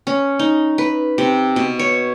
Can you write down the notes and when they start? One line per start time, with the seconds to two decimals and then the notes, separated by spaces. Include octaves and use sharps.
0.07 C#4
0.39 D#4
0.78 B4
1.18 C3
1.56 B2
1.79 C#5